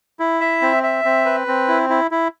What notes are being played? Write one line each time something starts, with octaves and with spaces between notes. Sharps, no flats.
E4
E5
C4
E5
C4
B4
C4
E4
E4
E4